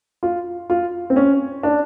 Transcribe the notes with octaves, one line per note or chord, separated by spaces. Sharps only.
F4
F4
C4
C#4
D4